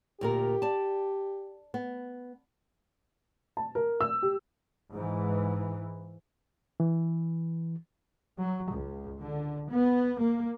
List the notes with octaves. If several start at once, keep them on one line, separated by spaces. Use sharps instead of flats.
D2 A#2 G4 A#4
D5 A5
B3
A5
A#4
E6
G4
G#2 E3
E3
F#3
C#2
D3
B3
A#3